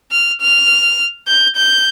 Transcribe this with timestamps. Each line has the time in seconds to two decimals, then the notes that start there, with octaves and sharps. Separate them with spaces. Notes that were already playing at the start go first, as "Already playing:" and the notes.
0.11 F6
0.41 F6
1.27 G6
1.56 G6